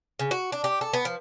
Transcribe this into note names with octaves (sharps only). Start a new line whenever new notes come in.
C#3
F#4
D4
G4
A4
B3
F3